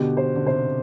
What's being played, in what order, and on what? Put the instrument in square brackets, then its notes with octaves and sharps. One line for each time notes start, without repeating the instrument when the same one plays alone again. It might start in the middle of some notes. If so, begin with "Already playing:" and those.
Already playing: [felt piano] B2 D3 [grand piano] G4
[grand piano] C5
[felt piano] D3
[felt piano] C3 [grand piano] C5